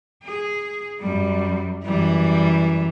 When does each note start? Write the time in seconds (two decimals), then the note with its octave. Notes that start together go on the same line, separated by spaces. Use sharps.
0.23 G#4
1.00 F#2 G3
1.85 F#2 E3 G3